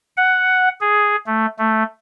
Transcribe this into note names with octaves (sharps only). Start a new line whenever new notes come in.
F#5
G#4
A3
A3